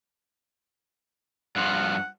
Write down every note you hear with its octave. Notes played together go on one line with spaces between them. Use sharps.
G2 F3 F#5